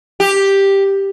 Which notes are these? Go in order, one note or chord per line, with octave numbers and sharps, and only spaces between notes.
G4